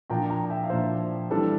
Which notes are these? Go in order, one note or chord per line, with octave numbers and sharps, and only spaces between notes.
A#2 F3 A#3 D4 G5 A#5
G5 A#5
E5 G5
F5
A#2 F3 A#3 D4 C5 E5
E3 G3 D4 A4 C5